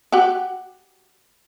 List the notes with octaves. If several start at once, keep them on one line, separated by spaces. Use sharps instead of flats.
F#4 G4 F#5